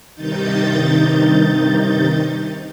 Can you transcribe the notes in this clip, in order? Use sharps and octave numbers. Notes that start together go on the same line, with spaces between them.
G2 C3 D#3 D#4 G6 A6